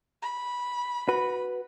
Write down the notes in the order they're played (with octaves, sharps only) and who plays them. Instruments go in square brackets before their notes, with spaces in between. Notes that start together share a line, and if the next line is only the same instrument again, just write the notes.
[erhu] B5
[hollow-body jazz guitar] F#4 B4